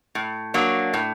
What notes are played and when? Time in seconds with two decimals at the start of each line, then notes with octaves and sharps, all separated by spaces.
0.15 A2
0.54 F#3 A#3 D4
0.94 A2